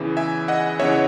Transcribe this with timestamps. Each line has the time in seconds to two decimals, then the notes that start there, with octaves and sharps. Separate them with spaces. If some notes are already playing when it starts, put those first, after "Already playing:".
Already playing: E2 C#3 E3
0.17 E5 G#5
0.48 D#5 F#5
0.79 E2 C#3 E3 C#5 E5